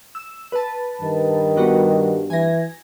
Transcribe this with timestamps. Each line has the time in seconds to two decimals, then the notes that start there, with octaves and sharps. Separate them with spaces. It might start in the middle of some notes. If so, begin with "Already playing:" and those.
0.15 E6
0.52 B4 A5
1.01 G2 D#3
1.56 G3 B3 F#4
2.30 E3 G#5 A#6